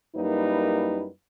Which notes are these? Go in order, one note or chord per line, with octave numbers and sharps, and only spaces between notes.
F#2 G3 A#3 D#4 E4 B4